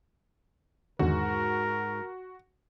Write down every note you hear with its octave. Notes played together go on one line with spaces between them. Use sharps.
E2 G#2 D3 D#3 F#4 A#4